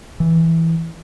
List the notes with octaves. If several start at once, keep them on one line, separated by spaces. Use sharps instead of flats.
E3